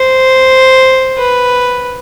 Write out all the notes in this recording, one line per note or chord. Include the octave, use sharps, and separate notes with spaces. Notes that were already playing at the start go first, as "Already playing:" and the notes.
Already playing: C5
B4